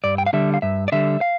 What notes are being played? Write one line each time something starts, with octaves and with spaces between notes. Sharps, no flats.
G2 D5
G5
F5
D3 G3 E5
F5
G2 E5
D5
D3 G3 E5
F5